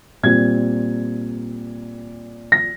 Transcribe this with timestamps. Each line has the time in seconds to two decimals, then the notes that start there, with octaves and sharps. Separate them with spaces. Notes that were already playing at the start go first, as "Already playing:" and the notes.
0.23 A#2 G3 C4 G#6
2.52 A#6